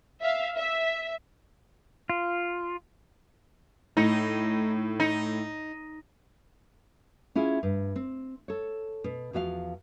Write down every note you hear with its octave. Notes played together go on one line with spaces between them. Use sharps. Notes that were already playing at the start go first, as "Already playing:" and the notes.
E5 F5
E5
F4
A2 D#4
D#4
C#4 E4 F4 G#4
G2
C4
A4 C#5
B2
E2 F3 F#4 E5 F5